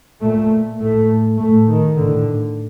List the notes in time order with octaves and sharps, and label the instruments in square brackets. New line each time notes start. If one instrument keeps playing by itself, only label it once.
[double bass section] A#2 A3
A2 A3
A2 A3
D#3
A2 D3